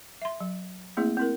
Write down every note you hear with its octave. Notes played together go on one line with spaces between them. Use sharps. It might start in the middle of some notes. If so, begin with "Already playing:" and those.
E5 C6
F#3
A3 A#3 C4 E4 G#4
C4 E4 A#4